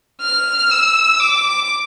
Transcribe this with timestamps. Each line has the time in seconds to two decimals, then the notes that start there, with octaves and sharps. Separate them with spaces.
0.22 F6
0.71 E6
1.20 D6